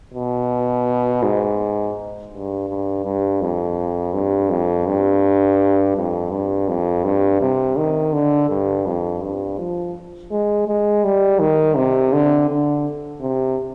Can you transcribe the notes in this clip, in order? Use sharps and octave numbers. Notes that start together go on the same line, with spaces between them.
B2
G#2
G2
G2
G2
F2
G2
F2
G2
F2
G2
F2
G2
C3
D#3
D3
G2
F2
G2
F3
G#3
G#3
G3
D#3
C3
D3
D3
C3